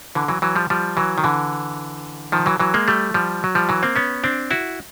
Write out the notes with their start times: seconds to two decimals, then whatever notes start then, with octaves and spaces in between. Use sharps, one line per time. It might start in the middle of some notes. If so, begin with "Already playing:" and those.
0.15 D3 E3
0.28 E3 F#3
0.42 E3 F#3
0.56 F3 G3
0.70 F3 G3
0.97 E3 F#3
1.18 D#3
1.24 D3 E3
2.32 D#3 F3
2.46 E3 F#3
2.60 E3 F#3
2.74 G#3 A#3
2.88 G3 A3
3.14 F3 G3
3.44 F#3
3.55 F3 G3
3.69 E3 F#3
3.83 A#3 C4
3.96 B3 C#4
4.24 C4 D4
4.51 E4 F#4